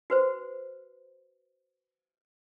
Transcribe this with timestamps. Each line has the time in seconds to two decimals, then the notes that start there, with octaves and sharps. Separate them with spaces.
0.10 F#4 B4 C5